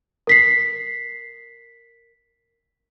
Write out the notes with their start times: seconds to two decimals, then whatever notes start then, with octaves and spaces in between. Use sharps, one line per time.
0.27 A#4 B6 C7